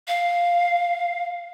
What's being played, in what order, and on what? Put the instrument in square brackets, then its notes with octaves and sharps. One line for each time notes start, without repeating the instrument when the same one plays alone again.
[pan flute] F5